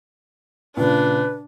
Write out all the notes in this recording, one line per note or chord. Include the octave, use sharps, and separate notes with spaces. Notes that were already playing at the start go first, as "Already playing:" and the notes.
A#2 C#3 D4 B4